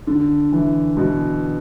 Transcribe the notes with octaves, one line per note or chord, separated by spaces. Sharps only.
D3
E3
B2